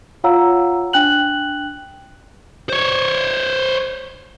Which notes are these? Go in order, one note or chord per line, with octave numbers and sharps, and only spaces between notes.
F4 C#5 F5 F#5 A#5 E6
D4 G5 F#6 F#7
C5 C#5